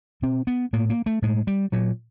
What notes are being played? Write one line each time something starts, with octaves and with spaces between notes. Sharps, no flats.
B2 C4
B3
A2 A#3
A#3
A3
A2 G#3
G3
A#2 F#3